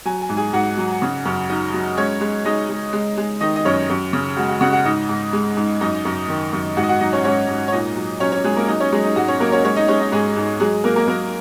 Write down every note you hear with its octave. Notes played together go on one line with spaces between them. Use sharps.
F#3 G#5
G#5
G#2
G#4 G#5
G#2 F#4 F#5
F#3
C#3
F#2
F#3 D#4 D#5
F#3
G#3 C#4 C#5
G#3
G#3 D#4 D#5
G#3
G#3
G#3
D#3 D#4 D#5
D#5
F#2 C#4 C#5
F#2
C#3
G#3 F#4
F#4
C#3 F#4 F#5
F#4 F#5
G#2 D#4 D#5
G#2
G#3
G#2
F#2 D#4 D#5
F#2
D#3
F#2
G#2 F#4 F#5
D#5
F#4 F#5
F#3 D#4 D#5
C#4 C#5
G#2 C#4 C#5
G#2
C#5
A#2 D#4 D#5
F#3
F#3 C#4 C#5
C#4 C#5
F#3 G#3 G#4
A#3 A#4
F#3 D#4 D#5
C#4 C#5
F#3 G#3 G#4
D#4
G#2 F#4
C#4 C#5
F#3 A#3 A#4
C#4 C#5
G#3 C#4 C#5
D#4 D#5
G#3 C#4 C#5
D#4 D#5
G#2 G#3 G#4
G#2
F#3 G#3 G#4
F#3 A#3 A#4
A#3 A#4
F#3 A#3 A#4